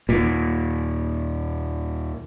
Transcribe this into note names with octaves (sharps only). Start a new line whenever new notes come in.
D#2 A#2